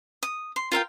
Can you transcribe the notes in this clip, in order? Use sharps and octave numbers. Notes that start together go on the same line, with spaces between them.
D#6
C6
F4 A#4 F5 G5